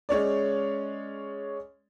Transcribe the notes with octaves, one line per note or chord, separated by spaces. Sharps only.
G#3 C#4 C#5 D5